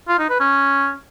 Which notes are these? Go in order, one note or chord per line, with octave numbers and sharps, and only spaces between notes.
F4
D#4
B4
C#4